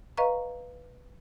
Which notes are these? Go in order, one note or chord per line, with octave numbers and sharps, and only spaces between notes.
B4 D#5 F5 A#5 C#6